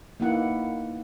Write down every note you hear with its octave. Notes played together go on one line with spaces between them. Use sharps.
A#3 B3 D#4 E4 F#5